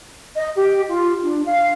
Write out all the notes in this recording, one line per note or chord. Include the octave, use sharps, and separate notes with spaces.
D#5
G4
F4
D4
F5